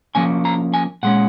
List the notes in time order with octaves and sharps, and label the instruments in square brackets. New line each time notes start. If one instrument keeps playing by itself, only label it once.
[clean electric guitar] F3 A#3 C#4 G#5
A#5
G#5
A#2 G#3 C#4 F#5